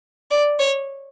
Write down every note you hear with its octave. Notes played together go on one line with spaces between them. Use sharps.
D5
C#5